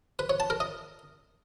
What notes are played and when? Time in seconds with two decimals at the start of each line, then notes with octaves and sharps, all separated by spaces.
0.19 B4
0.30 C#5
0.40 A5
0.50 A#4
0.60 D#5